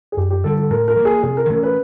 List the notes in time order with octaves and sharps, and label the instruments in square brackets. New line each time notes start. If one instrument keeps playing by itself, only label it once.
[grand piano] G#4
[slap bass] F#2 [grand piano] G4
[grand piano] G4
[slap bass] D3 G3 [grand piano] A4
[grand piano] A4
[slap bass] A2 [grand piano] A#4
[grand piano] A#4
[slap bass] F3 A#3
[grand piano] G#4
[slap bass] C3 [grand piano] G#4
[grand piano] A#4
[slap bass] E3 A3 C#4 [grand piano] A#4
[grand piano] B4